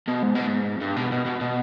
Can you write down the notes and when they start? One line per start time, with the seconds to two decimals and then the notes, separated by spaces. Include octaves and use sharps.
0.08 B2
0.23 G#2
0.35 B2
0.47 G#2
0.76 F2
0.81 G2
0.96 B2
1.12 B2
1.26 B2
1.41 B2